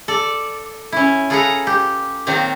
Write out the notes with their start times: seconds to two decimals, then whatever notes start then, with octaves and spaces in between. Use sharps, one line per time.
0.08 A4 D5
0.92 C#4 E4
1.30 F4 G#4 A4 B4 F#5 A#5
1.67 G4
2.26 A#2 D#3 F#3 C4 F4 A#4